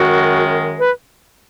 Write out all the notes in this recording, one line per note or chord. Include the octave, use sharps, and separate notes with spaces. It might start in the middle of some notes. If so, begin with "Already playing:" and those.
Already playing: F#2 D#3 G#3 F#4
B4